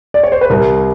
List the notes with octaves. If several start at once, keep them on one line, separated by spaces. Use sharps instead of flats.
D5
C#5
C5
B4
C2 A#4